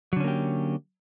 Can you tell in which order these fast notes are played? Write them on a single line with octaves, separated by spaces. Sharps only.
F#3 D3 C#4 A#3 G4